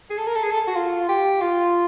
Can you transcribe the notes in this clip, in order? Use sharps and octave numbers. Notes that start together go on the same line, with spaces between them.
G#4
A4
A#4
A4
G#4
A4
F#4
F4
G4
F4